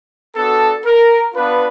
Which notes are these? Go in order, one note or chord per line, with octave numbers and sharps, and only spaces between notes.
B3 D4 F#4 A4
A#4
B3 D4 F4 B4